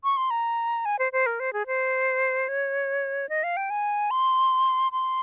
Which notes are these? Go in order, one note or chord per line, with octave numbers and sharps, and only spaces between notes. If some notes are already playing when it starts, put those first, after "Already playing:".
C#6
C6
A#5
G#5
C5
C5
A#4
C5
G#4
C5
C#5
D#5
F5
G5
G#5
C6
C6